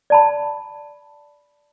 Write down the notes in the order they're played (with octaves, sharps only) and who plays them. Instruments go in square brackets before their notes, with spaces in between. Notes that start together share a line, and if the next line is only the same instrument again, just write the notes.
[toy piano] D5 A5 B5